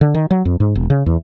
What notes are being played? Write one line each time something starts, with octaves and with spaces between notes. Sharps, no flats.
D3
D#3
F#3
F2
G#2
E1
C#3
E2